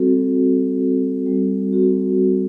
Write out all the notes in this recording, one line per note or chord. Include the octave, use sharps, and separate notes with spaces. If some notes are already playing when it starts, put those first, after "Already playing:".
Already playing: G3 C4 F#4 A4
G3
C4 F#4 A4
G3
C4 F#4 A4
G3